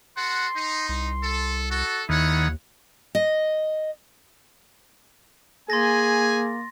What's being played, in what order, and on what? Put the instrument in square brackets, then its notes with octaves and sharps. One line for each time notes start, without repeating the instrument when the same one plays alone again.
[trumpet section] F#4 A4 F#5 [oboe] C6
[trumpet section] D#4
[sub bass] C2 [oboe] C6
[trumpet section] A4
[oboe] F#4 [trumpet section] A4
[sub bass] D#2 [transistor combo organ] D#3 [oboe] E4 [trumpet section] C#5 F#5
[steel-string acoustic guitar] D#5
[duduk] A#3 [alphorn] G#4 [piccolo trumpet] G#5 [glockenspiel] C6 A6 A#6